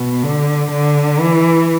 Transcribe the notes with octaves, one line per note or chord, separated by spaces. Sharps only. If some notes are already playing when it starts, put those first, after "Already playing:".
Already playing: B2
D3
D3
E3